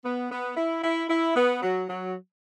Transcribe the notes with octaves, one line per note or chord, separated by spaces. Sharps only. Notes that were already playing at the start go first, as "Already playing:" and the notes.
B3
B3
E4
E4
E4
B3
F#3
F#3